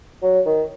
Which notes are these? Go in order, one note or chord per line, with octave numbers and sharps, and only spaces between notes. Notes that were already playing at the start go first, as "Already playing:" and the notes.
F#3
D#3